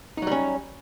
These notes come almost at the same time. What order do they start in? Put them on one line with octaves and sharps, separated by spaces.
D#4 F#3 G3 C#4